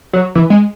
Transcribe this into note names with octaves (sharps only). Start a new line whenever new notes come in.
F#3
E3
G#3